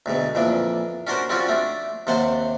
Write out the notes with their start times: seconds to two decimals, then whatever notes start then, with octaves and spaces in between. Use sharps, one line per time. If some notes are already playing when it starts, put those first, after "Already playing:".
0.06 D2 G#2 B2
0.35 F2 A#2 E3 D4
1.07 C#4 D4 F#4 A#4 C5
1.29 G3 C4 C#4 F4 F#4
1.48 A3 D4
2.07 D#2 C3 C5 F#5 A5 C6